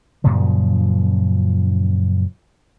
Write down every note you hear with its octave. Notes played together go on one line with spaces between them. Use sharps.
F#2 A#2 C#3 F3